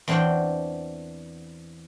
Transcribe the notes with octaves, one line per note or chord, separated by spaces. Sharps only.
E2 C4 D4 C#5 F#5 G5